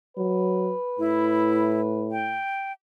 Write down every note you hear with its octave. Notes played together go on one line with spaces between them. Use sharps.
F#3 B4
A2 E4
G5